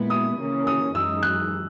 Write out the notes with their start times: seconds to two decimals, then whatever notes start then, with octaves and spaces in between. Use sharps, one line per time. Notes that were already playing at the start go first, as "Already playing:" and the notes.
Already playing: A#2 G#3 B3 E4
0.10 D#6
0.38 C#3 E3 A#3 C#4
0.67 D#6
0.94 F#2 E3 G#3 D#4 E6
1.23 F#6